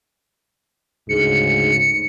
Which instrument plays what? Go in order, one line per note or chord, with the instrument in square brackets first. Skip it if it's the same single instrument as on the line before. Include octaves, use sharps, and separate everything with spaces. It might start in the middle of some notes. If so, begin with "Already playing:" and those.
[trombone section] D2 G#2 C#3 [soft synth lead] C#7